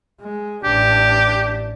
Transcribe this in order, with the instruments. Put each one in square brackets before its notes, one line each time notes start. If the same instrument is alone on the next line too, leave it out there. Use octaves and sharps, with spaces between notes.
[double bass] G#3
[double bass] A1 D4 [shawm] G4